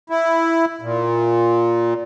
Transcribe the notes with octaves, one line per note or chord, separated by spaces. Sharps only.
E4
A#2